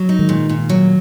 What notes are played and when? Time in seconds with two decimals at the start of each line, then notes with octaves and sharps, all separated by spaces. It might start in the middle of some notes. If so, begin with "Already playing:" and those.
Already playing: F#3
0.09 D#4
0.19 D#3 G#3
0.29 A#2
0.49 A#2
0.69 F#3